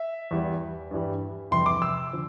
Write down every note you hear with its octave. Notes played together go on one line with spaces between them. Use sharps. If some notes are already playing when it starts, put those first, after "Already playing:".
Already playing: E5
E2 E3 G3
G2 E3 G3
F2 C3 E3 G3 C6
D6
E6
D3 F3